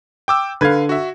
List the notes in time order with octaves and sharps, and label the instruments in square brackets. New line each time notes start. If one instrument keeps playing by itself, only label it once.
[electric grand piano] G5 D6 E6
[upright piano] D3 G#6 [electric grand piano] B4 F5
[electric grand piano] F#4 E5